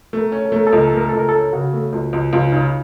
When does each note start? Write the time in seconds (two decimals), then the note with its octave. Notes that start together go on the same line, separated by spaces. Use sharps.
0.13 A3
0.19 A#4
0.32 C#4
0.46 A4
0.52 A3 A#4
0.67 A4
0.73 C#2 A#4
0.87 A4
0.93 A3 A#4
1.09 C#2 A4
1.19 A#4
1.29 A4
1.33 C#4
1.53 C#3 F#4
1.73 A3
1.93 C#2
2.13 C#2
2.33 C#2 F4
2.52 C#3 D#4